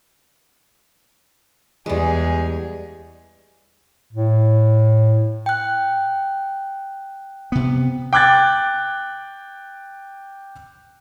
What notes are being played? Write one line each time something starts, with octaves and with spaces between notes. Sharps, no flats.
E2 G3 G#3 G#4
A2
G5 F#6
C3 B3
G5 D6 F#6 G#6 A6